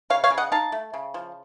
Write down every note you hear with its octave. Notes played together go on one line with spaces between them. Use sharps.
C#3 C#5 F5
C#5 F5
C#3
D#5 F#5
D#4 F5 A5
A3
C#3
F3